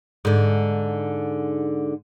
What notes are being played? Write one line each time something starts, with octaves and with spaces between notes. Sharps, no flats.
G#2 D3